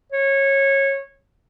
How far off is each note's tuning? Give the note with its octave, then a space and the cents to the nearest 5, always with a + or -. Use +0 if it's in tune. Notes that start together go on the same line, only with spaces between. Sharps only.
C#5 -20